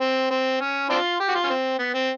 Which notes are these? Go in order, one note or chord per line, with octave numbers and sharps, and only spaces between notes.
C4
C4
C#4
C4 D4 F4
G4
F#4
F4
C#4
C4
B3
C4